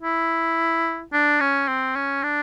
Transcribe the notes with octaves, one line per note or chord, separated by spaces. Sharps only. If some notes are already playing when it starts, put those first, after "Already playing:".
E4
D4
C#4
C4
C#4
D4